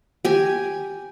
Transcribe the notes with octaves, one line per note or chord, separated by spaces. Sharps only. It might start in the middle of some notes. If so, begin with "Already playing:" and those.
G4 G#5